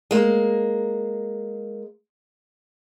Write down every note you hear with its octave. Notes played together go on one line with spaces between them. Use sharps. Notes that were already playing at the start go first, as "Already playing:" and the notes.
G#3 A#3